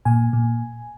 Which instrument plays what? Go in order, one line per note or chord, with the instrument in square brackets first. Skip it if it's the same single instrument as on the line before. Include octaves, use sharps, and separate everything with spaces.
[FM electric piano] A#2 G#5
A#2